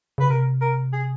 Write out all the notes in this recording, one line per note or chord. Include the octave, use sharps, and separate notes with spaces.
C#3 B4
C3 A#4
A#4
G#4